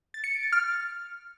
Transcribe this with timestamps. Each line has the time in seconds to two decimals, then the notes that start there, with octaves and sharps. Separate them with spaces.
0.14 A6
0.24 C#7
0.33 D7
0.43 A6
0.52 F6